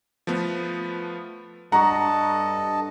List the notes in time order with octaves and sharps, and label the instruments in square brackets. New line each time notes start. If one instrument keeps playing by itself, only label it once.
[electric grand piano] F3 A3 B3
[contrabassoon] G2 [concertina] A4 D#5 A5 [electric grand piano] F#5 [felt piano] A#5 C#6